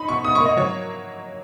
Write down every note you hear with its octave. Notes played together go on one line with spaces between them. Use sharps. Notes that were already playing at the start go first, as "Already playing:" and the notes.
Already playing: D#4 B5
B2 C#6
B2 D#6
C#6
A#3
D#5
F#3 C#5